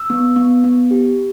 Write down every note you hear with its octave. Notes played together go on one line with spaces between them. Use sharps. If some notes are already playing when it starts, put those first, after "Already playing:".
Already playing: E6
B3
B3
B3
G4